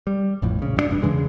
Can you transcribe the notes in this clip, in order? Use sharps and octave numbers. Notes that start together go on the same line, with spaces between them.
G3
A1 F2 A2
A#1 C#3
F#2 F3 D4
F1 G2 D4
E2 C#3 E3 G#3